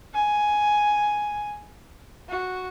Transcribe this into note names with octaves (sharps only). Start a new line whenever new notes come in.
G#5
F#4